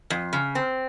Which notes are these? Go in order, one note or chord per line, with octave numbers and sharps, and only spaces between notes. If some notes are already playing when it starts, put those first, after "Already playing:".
F2
C#3
C4